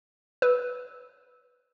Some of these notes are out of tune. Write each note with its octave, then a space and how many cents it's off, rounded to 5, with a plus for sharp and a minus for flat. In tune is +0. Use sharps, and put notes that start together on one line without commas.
B4 +0 E6 -15